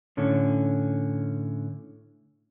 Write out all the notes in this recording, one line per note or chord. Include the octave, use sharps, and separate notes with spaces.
A2 D3 C#4